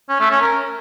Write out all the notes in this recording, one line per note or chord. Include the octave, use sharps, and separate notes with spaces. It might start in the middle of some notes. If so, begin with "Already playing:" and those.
C#4
A3
C#4
A#4